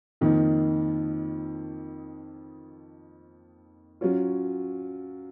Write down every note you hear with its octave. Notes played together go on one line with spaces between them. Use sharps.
F2 D#3 A#3 D#4
F#3 C#4 F4